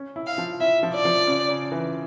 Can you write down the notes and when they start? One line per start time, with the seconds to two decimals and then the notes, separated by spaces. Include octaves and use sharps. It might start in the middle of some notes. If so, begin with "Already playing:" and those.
Already playing: C#4
0.16 E4
0.27 F5
0.38 F3
0.60 E4 E5
0.83 F3
0.94 D5
1.05 F3
1.27 C#3
1.50 C#3
1.72 E3